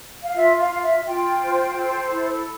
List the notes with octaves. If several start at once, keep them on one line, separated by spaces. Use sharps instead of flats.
F5
F4 E5
F5
F4
E5
F4 G5
C5
A4
E4